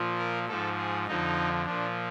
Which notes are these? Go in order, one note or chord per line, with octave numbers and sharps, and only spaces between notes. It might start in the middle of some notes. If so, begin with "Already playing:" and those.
Already playing: A#2 F3
A#4
G#2 F3 A4
G#4
F2 D3 F3 D#4
A#2 F3 D4